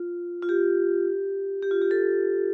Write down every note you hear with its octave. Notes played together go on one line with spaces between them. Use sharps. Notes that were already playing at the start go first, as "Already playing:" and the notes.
Already playing: F4
F4
G4
G4
F4
G4
A4